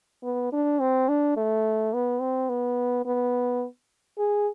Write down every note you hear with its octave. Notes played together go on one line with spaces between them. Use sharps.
B3
D4
C4
D4
A3
B3
C4
B3
B3
G#4